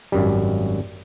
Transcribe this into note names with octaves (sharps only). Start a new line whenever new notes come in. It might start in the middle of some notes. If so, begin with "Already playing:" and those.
G#1 F#2 G3